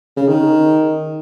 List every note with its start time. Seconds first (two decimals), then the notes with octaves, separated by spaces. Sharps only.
0.17 C#3
0.28 D#3